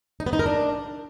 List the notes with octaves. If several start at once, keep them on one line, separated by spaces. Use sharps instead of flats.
D#4
B3
D#4
A#4
D4